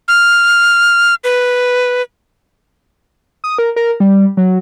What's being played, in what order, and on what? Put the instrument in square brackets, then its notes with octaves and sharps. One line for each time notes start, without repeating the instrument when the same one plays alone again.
[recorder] F6
B4
[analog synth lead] D#6
A#4
A#4
G3
F#3